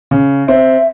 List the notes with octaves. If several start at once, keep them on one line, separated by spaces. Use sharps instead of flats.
C#3
C4 E5